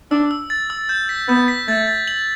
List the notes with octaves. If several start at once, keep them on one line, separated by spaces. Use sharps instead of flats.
D4 E6
E6
A6
E6
G6
B6
B3 G6
B6
A3 A6
A6
F#7